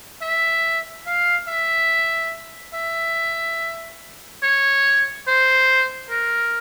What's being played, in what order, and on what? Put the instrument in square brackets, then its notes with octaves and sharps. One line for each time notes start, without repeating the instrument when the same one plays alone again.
[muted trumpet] E5
F5
E5
E5
C#5
C5
A#4